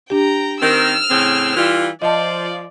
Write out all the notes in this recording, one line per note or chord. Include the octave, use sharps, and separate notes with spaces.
D4 G4 G5 A#5
D#3 C4 E6 F6
A2 C#3 C4
E3 G3 F4
F3 D5 D#5 A5